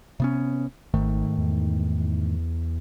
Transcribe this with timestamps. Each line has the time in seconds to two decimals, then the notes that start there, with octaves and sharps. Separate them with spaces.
0.20 C3 B3 C#4
0.94 G#1 G#2 D#3 A3
1.38 E2